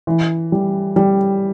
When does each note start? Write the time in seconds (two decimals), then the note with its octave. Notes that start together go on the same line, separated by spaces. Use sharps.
0.07 E3
0.52 G3
0.96 G3